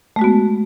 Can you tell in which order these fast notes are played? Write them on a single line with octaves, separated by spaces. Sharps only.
A3 G#3 F#4 B3